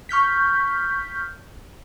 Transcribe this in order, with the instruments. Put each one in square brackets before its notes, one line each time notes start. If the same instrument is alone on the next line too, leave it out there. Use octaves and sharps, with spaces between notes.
[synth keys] C#6 F6 G6 B6